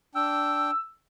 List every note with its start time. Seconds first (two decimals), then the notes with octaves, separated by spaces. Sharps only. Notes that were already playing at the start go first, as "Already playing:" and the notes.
0.15 D4 G5 E6